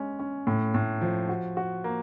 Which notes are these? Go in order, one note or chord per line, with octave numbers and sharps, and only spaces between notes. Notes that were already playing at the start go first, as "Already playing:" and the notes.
Already playing: G#3 C#4
C#4
A2
A2
F3
F#4
F#4
A#3